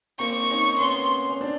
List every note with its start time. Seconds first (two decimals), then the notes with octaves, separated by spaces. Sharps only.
0.19 A#3 C4 C#6
0.50 C#4 D#4
0.80 B3 C#4 C6
1.29 C#4
1.41 C4 D4